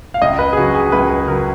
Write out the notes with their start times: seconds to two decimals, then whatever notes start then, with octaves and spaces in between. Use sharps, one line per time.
0.14 F5
0.22 C#2 D#5
0.39 B4
0.53 G#4
0.57 C#3 F#3 F#4
0.75 G#4
0.92 C#2 B4
1.10 B4
1.27 C#3 F#3 A#4